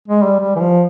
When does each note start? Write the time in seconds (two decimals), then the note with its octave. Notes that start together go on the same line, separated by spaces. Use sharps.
0.08 G#3
0.24 G3
0.40 G3
0.56 E3
0.60 F3